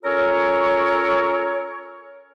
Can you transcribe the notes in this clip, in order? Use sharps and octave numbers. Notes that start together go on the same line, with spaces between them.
C#4 F4 A4 A#4 C#5